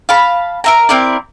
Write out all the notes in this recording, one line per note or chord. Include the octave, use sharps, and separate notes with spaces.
F5 A5 B5
A#4 E5 A#5
C4 E4 A#4 D5